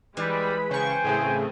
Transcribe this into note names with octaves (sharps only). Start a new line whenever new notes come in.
E3 G3 G#3 B5
C#3 C5 G5 G#5 C#6
A2 C#3 A3 C4 G#4